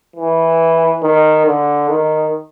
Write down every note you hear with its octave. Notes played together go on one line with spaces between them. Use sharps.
E3
D#3
D3
D#3